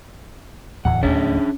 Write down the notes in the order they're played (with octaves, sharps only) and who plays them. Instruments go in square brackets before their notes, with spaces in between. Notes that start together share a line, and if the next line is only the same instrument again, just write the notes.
[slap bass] D1 E2 A2 [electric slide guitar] F#5
[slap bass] D1 D#2 A3 [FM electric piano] C#4 [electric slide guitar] D4 G#4 E5